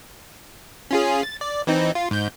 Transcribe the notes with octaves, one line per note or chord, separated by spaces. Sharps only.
C#4 F4 G#4
A6
D5
E3 C4 D#4
F4
G#2 G6